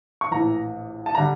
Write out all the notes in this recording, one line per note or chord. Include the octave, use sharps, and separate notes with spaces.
C#6
A#1 A2 E3 A#5
A5
D3 G3 A#5